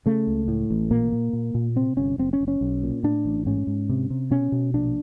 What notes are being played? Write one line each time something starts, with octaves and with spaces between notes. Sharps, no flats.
C#3 A3
C#2
A2
A1
A#2 A#3
A#2
A#2
A#2
C3 C4
G1 C#4
F#1 C4
C#4
F#1
C#4
B1
A#2
A2 D4
A1
G#2 C#4
G#2
C3
C3
B2 C#4
B2
A#1 D4